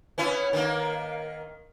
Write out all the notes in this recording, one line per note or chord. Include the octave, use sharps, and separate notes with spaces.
B3 C#4 E4
D#3 A#3